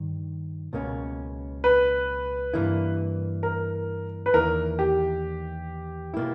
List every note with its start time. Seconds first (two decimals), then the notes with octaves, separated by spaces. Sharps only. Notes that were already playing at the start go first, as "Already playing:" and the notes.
Already playing: G2 D#3
0.73 C#2 B2 A#3 C#4
1.64 B4
2.54 G2 E3 A#3 E4
3.43 A#4
4.26 B4
4.33 E2 D#3 A#3 E4 A#4
4.79 G4
6.14 B2 A#3 E4